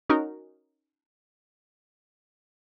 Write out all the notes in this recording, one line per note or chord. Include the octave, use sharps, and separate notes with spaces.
C#4 D#4 F#4 A#4